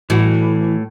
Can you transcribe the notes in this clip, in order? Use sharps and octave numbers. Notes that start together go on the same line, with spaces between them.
A2 E3 F#4